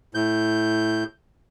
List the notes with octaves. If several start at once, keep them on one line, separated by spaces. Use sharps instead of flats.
A2 G6